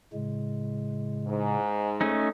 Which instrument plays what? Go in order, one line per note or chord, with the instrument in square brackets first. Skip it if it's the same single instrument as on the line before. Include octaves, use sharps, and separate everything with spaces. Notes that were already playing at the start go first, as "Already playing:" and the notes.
[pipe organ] A2 C#3 G#3
[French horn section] G#2
[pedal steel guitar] A3 C#4 D#4